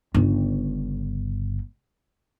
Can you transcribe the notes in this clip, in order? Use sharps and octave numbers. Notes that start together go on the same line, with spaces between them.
G1 C#3